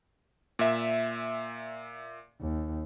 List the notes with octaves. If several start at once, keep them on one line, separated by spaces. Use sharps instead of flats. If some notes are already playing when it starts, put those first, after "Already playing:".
A#2 E5
D#2